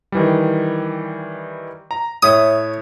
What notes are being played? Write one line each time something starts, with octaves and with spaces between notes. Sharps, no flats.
D#3 E3 G3
A#5
A2 C#5 E5 D#6